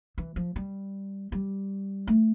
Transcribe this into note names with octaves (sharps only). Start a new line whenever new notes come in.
E3
F3
G3
G3
A3